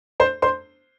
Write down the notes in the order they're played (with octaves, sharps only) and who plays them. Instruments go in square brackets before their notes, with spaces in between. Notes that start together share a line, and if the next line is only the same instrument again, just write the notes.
[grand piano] C5 C6
C5 C6